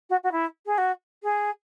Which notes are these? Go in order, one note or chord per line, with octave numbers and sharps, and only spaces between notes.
F#4
F#4
E4
G#4
F#4
G#4